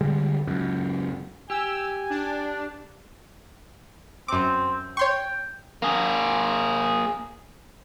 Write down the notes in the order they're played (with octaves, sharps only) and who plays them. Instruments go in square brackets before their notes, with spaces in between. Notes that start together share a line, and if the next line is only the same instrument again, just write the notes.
[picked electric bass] D3 G3 G#3
F#1 C#2 F#2
[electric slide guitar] G4 [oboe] G#5 [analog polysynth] E6
[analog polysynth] D4
[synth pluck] F#2 D6 [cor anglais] C4
[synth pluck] C#5 C6 C#6 [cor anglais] G5
[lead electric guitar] A#3 G#4